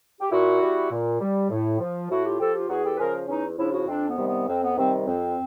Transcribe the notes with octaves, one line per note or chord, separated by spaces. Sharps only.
G4
A#2 E4 F#4
G3
A#2
G3
A2
F3
A2 E4 F#4
F4 G4
F3 G4 A4
F4 G4
E2 F#4 G#4
G4 A4
B4
C#3 F3 G#4 A#4
E2 C#4 D#4
C#3 F3 D4 E4
E4 F#4
F2 C4 D4
B3
C3 D#3 G3
B3
F2 C4
B3
C3 D#3 G3 C4
F2 C4